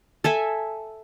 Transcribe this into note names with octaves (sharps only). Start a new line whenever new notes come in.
A4 E5 G#5